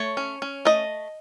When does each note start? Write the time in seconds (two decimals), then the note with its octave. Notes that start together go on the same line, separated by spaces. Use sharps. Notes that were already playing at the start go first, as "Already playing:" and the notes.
Already playing: A3 C#5
0.17 C#4
0.42 C#4
0.65 A3 D#5